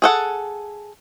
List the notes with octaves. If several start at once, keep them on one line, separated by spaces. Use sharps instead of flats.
G#4 A4 F#5